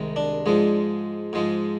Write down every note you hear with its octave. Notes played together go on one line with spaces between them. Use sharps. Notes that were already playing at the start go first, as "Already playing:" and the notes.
Already playing: C2 C3 D#3 G#3
D4
G#2 F3 G#3
G#2 F3 G#3